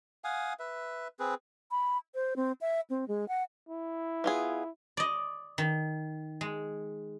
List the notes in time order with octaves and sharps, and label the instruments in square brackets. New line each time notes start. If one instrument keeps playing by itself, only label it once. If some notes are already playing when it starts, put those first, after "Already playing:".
[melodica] F5 F#5 G#5 D#6
B4 E5
C4 G#4 B4
[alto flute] B5
C5
C4
E5
C4
G#3
F#5
[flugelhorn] E4
[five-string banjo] B3 F4 G#4
[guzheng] D5 D#5
D#3
G#3